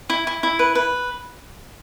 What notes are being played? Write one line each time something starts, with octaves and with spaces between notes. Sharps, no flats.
E4
E4
E4
B4
B4